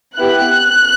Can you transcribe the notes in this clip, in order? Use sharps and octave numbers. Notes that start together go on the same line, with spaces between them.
B3 E4 G4 F#6